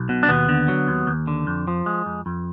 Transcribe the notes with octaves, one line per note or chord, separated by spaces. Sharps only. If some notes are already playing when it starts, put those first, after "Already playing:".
Already playing: B1
B2
D4
D#2 B3
D3
F#3
D#2
D#2
D3
F2
F3
G#3
F2
F2